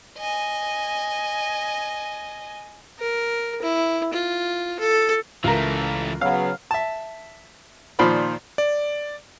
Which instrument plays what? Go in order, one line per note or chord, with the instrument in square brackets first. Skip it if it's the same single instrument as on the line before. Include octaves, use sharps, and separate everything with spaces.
[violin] D#5 G#5
[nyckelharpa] A#4
E4
F4
A4
[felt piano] C#2 [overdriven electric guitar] E3 A3 [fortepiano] F4 A#4
[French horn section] C#3 F#3 B3 [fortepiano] F5
[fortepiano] E5 A5
A#2 D#3 F3 C5 D5 B5
[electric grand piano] D5